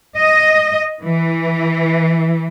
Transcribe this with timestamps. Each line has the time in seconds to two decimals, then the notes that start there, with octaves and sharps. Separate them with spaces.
0.17 D#5
1.02 E3